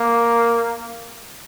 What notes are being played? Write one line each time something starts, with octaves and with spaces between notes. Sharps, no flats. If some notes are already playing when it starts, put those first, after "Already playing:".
Already playing: A#3